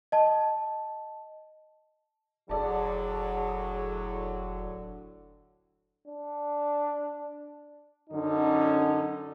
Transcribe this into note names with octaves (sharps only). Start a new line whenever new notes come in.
D#5 A5
F1 A2 D3 F#3 G#4 A4 D5 A5
D4
F#2 D3 C#4 D#4